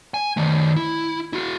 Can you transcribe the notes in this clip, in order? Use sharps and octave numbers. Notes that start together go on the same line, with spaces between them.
G#5
D#3 A3
E4
E4 F#4